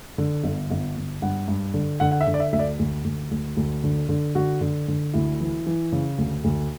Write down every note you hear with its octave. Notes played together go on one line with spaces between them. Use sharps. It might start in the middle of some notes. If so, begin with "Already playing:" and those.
D3
G1
G1
G1
G2 F#5
G2
D3
D3 F#5
F#5
E5
D3
D5
E5
D2 E5
D5
D2
D2
D2
D2
D3
D3
D3 F#4
D3
D3
D2 E4
E3
E3
C#3
D2
D2